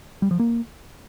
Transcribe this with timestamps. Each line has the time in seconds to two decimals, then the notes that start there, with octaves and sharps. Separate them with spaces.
0.22 G3
0.31 F3
0.40 A#3